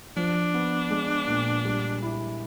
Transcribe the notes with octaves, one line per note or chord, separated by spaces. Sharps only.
F3 D4
B3
G#3
A#2
G3
E4